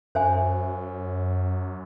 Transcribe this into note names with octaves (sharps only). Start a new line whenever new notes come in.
F#2 C5 E5 G#5